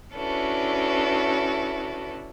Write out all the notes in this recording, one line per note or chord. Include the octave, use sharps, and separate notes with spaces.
C#4 D4 E4 F#4 A4 B4